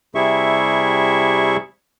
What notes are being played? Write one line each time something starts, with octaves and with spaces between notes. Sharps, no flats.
C3 G3 E4 G#4 E5 C#6